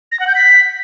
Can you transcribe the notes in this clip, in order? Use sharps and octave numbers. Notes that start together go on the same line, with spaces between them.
A#6
F#5
G6
B6